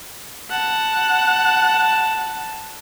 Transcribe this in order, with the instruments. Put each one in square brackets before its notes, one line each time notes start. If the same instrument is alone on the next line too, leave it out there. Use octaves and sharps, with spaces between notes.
[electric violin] F#5 [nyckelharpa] A5